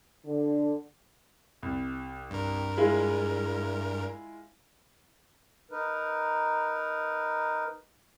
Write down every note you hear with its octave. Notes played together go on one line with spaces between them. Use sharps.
D3
C2
G2 A#4
G#3 E4 F4
D#4 A#4 B4